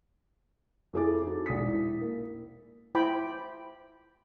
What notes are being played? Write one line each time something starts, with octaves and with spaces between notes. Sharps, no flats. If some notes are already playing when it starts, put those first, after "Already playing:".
F2 E4 G#4 A4 D6 A6
D#4 F#4 A4
E1 A#1 D#4 D#6 B6
E4
A#3
E4 C5 G5 B5 D6